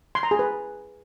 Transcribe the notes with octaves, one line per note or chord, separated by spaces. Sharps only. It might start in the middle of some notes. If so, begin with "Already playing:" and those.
C6
A#5
G#4
B4